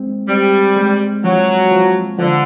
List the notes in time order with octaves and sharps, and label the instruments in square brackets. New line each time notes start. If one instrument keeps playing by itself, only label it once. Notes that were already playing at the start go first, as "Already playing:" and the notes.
Already playing: [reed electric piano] G#3 C4
[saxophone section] G3 [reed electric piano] C4
[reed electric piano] G#3
[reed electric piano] F3 [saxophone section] F#3
[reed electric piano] F3
[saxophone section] D3 [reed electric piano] F3